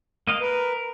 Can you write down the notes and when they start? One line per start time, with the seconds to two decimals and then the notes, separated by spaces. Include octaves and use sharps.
0.27 A#3 D#5 F5
0.41 A#4 B4